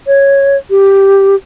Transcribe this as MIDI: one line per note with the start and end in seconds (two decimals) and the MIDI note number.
0.07 0.57 73
0.70 1.35 67